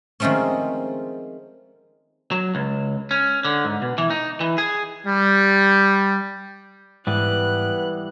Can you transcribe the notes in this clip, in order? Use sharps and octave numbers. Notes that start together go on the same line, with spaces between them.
D#3 F3 G#3 A3 C4 C#4
F#3
C#2
C#4
D3
G#2
B2
E3
D#4
E3
G#4
G3
G#2 E3 G3 B3 F#6